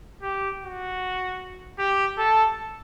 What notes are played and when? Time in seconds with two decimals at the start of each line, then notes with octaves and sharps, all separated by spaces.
0.22 G4
0.62 F#4
1.79 G4
2.18 A4